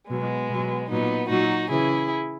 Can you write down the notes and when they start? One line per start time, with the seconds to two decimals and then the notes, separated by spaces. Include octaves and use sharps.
0.10 B2 F#3 G#3 B3
0.50 B2 F#3
0.89 A#2 F#3 B3 D#4
1.29 A#2 F#3 D#4 F#4
1.70 C#3 E3 E4 G#4